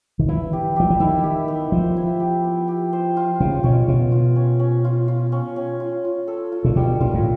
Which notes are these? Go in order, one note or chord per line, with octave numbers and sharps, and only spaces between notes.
D#3
E3 E4
G4
F3 G4
E3
D#3 E4
G4
B3
F3 C5
E4
G4
B3
G4
C5
F4
C#3 F4
B2 C#4
B2 F4
F4
C#4
C#4
F4
F4
C#4
C#4
F4
F4
A4
F4
A#2
B2 G3
A#2 F4
A2